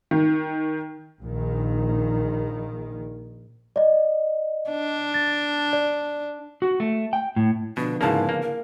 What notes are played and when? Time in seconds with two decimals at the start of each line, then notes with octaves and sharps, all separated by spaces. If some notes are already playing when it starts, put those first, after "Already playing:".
0.11 D#3
1.22 A#1 D#3
3.76 D5 D#5
4.70 D4
5.14 A6
5.73 D5
6.62 F#4
6.80 A3
7.13 G5
7.36 A2
7.77 B2 D3 F3 B3 D4
8.01 G#2 C#3 A#3 E4 A5
8.29 A#3
8.42 A#4